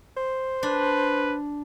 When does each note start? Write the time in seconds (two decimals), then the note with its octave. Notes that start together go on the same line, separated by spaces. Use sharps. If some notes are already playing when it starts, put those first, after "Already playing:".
0.17 C5
0.63 D4 B4